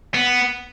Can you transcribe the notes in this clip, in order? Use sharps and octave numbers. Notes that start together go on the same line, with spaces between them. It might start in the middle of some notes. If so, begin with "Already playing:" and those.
B3